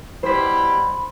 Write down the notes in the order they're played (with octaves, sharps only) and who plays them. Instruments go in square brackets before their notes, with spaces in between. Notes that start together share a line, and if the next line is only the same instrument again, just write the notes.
[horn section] B2 G3 G4 [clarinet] E4 [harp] C5 B6 [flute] B5